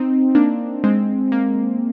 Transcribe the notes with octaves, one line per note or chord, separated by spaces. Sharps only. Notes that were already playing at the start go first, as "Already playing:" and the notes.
Already playing: C4 D#4
A#3 D4
G#3 C4
A#3